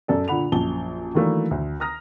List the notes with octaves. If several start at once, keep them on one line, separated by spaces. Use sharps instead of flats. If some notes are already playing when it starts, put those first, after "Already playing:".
F#2 A4 D5
A#2 D3 F#5 B5 F7
A#1 F#2 A5 G7
D#3 E3 F#3 A3 A#3 D4
D2
A#5 D#6 F6 A#6